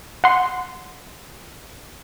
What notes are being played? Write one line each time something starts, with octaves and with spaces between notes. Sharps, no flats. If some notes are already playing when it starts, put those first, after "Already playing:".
F#5 C6